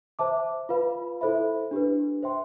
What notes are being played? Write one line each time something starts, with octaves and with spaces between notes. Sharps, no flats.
C5 E5 A5 D6
F4 B4 F5 B5
E4 A4 C5 E5 B5
D4 G4 B4
C5 E5 G5 C6